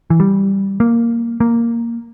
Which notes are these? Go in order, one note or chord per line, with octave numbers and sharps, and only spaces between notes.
E3
G3
A#3
A#3